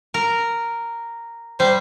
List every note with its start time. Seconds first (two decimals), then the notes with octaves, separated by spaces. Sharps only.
0.14 A#4
1.60 G3 C5